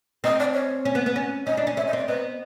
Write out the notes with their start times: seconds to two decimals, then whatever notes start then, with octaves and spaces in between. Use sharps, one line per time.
0.24 C4 D#5
0.40 D5
0.54 C#5
0.85 C#4
0.95 B3
1.06 B3
1.16 C#4
1.46 C#4 D#5
1.57 D4
1.67 C#4
1.77 C#4 E5
1.87 D#5
1.93 C4 D5
2.07 B3 D#5